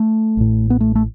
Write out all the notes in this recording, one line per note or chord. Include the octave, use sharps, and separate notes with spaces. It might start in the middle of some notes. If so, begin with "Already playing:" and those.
Already playing: A3
A1 A2
B3
A3
A3